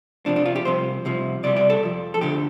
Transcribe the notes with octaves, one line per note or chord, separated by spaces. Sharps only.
F2 C3 F3 D4
D4
F4
G4
C2 C3 F3 C5
C2 C3 F3
C2 C3 G3 D5
D5
A4
F2 F3
A4
D2 D3 F3 G4